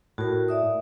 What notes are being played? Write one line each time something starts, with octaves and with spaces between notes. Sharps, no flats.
A2 F#4 A#4
D5 E5 D#6